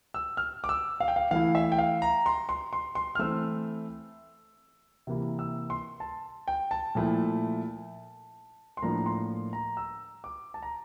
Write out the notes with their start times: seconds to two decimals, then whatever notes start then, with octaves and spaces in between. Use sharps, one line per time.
0.14 E6
0.37 F6
0.64 D6
0.69 E6
1.00 F5
1.08 G5
1.16 F5
1.31 E3 A3 E4 F5
1.55 E5
1.72 G5
1.79 F5
2.02 A#5
2.26 C6
2.49 C6
2.73 C6
2.95 C6
3.15 F6
3.19 E3 A3 C4 E4 E6
5.07 C3 E3 A#3 E4
5.39 E6
5.70 C6
6.00 A5
6.48 G5
6.71 A5
6.95 A#2 F3 A3 E4
8.77 C6
8.82 A2 F3 A#3 D4 F4 A#5
9.06 C6
9.53 A#5
9.77 E6
10.24 D6
10.54 A5
10.62 A#5